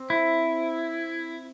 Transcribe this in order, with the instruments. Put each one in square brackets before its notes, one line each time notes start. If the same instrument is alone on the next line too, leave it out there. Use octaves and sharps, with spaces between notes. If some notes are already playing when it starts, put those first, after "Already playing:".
Already playing: [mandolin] C4
[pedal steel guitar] E4